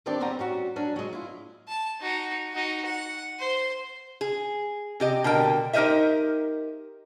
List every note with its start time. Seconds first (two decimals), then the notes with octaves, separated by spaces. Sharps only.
0.06 D#3 E3 C4 D4 G4 D5
0.20 E2 G3 C4 C#4 F#5 A#5
0.39 G3 C#4 F#4
0.76 F#3 C#4 D4
0.96 F#3 G#3
1.13 E4 F4
1.68 A5
2.01 D#4 F#4
2.53 D#4 F#4
2.85 F#5
3.39 C5
4.21 G#4
5.00 C3 G4 D#5
5.24 B2 D3 A#4 G5
5.73 D#4 G4 A#4 C5 D#5 E5